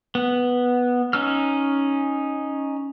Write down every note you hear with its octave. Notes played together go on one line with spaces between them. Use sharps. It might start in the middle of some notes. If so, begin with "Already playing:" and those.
B3
C#4 D#4 E6 F6